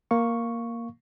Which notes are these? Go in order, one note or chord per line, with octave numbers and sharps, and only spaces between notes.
A#3 F5 C#6